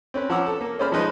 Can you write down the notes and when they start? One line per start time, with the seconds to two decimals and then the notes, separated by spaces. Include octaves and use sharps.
0.14 C4 C#4 B4
0.30 F3 C#5 F#5 A#5 D6 E6
0.46 A4
0.61 A#3
0.79 C#4 G#4 C5 D5 B5 F6
0.92 F3 G#3 D#4 B4 D5 C6